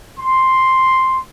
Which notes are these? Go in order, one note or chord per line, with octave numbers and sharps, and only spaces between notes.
C6